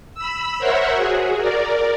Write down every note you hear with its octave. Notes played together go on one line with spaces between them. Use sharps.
B5 E6
A#4 C5 C#5 E5 F#5
F#4 G#4
A#4 D5